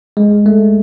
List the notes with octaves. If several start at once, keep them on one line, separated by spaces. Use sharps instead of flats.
G#3
A3